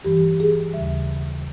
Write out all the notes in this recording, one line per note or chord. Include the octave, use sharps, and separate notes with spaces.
G2 E3 G3 G4
G#4
D#2 C#3 G3 E5